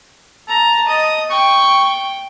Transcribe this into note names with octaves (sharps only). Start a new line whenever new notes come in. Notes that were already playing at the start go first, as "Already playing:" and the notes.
A5 A#5
D#5 D#6
G5 C#6